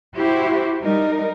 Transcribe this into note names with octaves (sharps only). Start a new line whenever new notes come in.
E4 F#4 G4 C5
G3 D#4 A#4